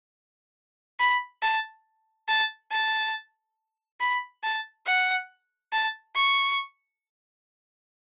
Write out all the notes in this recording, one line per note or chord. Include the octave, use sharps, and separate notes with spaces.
B5
A5
A5
A5
B5
A5
F#5
A5
C#6